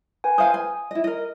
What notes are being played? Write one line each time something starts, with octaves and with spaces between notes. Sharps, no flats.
B4 G5 G#5
C5 F5 G#5 D#6
G#5
E4 D#5
A#4 D#5